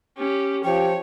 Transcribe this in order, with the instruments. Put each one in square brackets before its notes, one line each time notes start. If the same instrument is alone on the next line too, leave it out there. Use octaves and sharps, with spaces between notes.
[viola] C#4 G4
[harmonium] F3 [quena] G4 [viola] C#5 [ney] G5